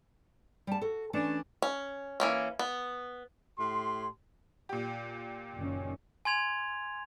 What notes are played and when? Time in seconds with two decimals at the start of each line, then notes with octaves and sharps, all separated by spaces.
0.67 G3 A5
0.81 F#4 A4
1.13 E3 A3 C#4 D4
1.62 C#4
2.20 E3 A#3 C#4
2.59 B3
3.59 A2 G4 C6
4.69 A#2 G4
5.55 F#1 D#3 C#4
6.25 G#5 C6 G#6 F7